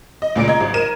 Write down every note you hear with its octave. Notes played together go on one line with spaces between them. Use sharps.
D#5
C#2 A#2 D5 D7
D#5 A#5 G#6
G#1
A#4 D#7 E7